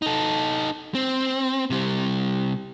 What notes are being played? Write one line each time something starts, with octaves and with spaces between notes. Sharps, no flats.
D#4 A4
C4
C3 G3